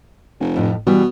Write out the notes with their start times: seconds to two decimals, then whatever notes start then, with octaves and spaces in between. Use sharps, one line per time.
0.40 F1
0.56 F2 A2
0.87 B2 E3 G3